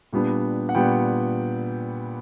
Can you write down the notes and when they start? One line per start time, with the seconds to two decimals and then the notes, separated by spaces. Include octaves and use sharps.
0.13 A#2 G3 B3 D4
0.69 F#5
0.75 A#2 G3 B3 D4 G5